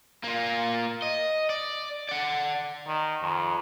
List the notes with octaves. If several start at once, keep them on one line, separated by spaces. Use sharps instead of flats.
A#3 F4
D#5
D5
D5 F#5
D#3
F2